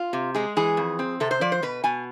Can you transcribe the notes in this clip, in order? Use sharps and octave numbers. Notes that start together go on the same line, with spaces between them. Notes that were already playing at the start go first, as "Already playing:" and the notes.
Already playing: F4
C3
G#3 G#4
E3 G#4
F2
C4
C3 A4
C5
F3 D5
C5
B2 B4
B2 G#5